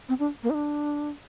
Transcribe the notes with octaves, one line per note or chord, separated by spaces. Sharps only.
C4
D4
A#3
D#4
D4